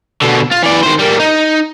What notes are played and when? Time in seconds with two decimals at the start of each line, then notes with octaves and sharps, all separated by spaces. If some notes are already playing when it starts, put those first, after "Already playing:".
0.22 B2 D3
0.52 F4
0.63 E3 D5
0.83 D#3 C5
0.99 G3 A#3
1.20 D#4